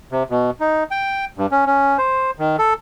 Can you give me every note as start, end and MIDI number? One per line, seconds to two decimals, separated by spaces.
0.12 0.23 48
0.30 0.50 47
0.60 0.84 63
0.91 1.25 79
1.38 1.46 43
1.51 1.66 61
1.66 1.97 61
1.98 2.31 72
2.39 2.56 51
2.59 2.74 69